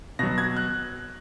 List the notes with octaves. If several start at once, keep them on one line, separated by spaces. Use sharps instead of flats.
B2 F#3 A#6
G#6
F#6